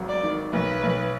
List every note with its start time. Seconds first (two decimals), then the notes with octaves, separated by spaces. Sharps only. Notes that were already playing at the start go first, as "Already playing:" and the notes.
Already playing: G#1 F#3 B3
0.09 D5
0.23 D#3
0.53 B1 B4
0.83 B1